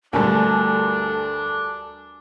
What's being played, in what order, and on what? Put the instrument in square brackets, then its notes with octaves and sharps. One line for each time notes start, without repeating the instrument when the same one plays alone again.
[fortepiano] D2 G2 [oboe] D4 [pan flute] A4 [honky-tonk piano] A#4 G#5 A5